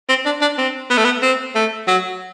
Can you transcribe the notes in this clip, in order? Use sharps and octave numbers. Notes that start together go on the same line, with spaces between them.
C4
D4
D4
C4
B3
A3
B3
C4
A3
F#3